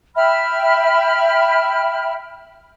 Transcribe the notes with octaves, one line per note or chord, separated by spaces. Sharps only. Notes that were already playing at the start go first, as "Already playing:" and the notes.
E5 G5 B5 F6